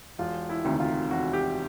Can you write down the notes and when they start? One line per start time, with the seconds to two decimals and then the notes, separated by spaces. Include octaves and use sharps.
0.18 E1 F4
0.49 E4
0.64 D2 C3 D#3
0.80 F4
1.11 E1 F#4
1.33 G4